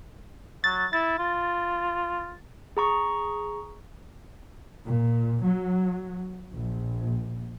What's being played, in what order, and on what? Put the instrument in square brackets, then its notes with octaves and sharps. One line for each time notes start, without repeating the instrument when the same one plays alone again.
[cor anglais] F#3 [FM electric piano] A6
[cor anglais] E4 [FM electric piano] A6
[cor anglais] F4
[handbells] G#4 A#5 C#6
[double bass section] A#2
F#3
A#1